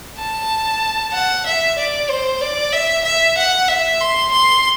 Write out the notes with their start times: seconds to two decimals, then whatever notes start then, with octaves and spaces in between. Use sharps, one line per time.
0.18 A5
1.14 F#5
1.46 E5
1.78 D5
2.10 C5
2.41 D5
2.73 E5
3.05 E5
3.38 F#5
3.68 E5
4.01 C6
4.32 C6